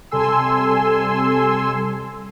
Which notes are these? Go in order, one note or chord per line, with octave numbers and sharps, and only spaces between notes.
C3 G3 A4 G#5 C6 E6